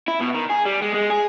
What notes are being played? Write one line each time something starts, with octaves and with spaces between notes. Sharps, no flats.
E4
B2
D#3
G#4
G3
G#3
G#3
G#4